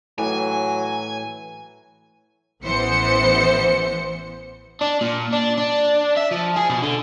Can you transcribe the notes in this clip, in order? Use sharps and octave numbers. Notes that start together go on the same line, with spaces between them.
A2 E3 F#3 G#5
A1 E3 B3 C5 C#7
D4
A#2
D4
D4
E5
F3
G#4
B2
D3